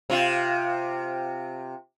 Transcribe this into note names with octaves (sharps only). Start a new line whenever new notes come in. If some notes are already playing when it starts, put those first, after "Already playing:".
C3 F4